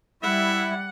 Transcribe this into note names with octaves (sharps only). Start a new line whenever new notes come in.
G3 E4 E5 F#5